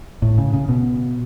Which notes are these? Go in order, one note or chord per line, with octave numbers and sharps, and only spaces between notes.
A2
C#3
C#3
B2